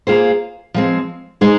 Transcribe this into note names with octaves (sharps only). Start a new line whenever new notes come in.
A#3 F4 G#4 C5
F3 G#3 C4
G#3 D#4 G#4 C5